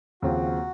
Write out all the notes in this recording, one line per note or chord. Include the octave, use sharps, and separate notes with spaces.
D#2 C#3 F3 C4 F#4